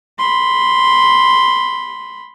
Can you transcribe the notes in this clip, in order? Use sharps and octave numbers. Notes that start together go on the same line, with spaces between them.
B5 C6